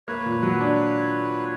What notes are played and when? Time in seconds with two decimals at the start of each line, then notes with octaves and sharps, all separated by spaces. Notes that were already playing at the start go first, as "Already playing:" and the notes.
0.08 A#3 B4 C#5
0.26 A#2
0.42 F#3
0.60 D4